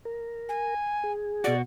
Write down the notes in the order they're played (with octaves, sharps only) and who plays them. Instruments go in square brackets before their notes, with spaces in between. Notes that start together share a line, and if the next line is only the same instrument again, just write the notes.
[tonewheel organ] A#4
[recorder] G#5
[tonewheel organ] G#4
[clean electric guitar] B2 F#4 [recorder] D5